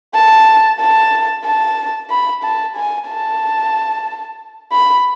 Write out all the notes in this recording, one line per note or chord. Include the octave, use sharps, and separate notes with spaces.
A5
A5
A5
B5
A5
G#5
A5
B5